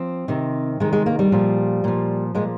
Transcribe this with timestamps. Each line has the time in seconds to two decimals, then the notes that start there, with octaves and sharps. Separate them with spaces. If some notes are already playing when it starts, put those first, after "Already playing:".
Already playing: F3 C4
0.28 C3 D#3
0.80 C3 D#3 G#3
0.93 G#3
1.06 A#3
1.19 G3
1.32 A#2 F3
1.84 A#2 F3
2.35 A#2 F3 G#3